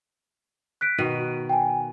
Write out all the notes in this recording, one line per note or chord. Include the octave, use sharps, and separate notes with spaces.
F#6 B6 D7
B2 D#3 D#7
G5 G#5